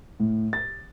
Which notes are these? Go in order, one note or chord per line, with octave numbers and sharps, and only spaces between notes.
A2
A6